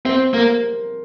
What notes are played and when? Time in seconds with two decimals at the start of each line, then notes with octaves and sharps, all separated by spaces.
0.05 C4 C5
0.34 A#3 A#4